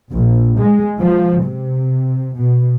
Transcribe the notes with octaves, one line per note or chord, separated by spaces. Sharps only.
A#1
G#3
F3
C3
B2